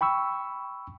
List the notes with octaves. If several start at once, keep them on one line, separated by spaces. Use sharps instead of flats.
G5 B5 C#6 E6